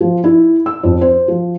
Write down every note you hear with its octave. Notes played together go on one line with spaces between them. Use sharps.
F3
E4
E6
F2
C5
F3